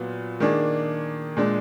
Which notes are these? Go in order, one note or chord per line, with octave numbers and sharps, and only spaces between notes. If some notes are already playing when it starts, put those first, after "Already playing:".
Already playing: A#2 F#3 B3 F4
D#3 A#3 D4 G#4
A#2 G#3 D4